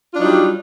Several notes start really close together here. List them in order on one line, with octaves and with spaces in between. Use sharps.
F4 D4 F#3 D#4 G3